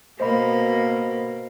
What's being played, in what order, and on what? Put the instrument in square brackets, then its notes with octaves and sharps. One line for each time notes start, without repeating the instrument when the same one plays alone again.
[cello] B2 A#3 [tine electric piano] C5 D#5 B5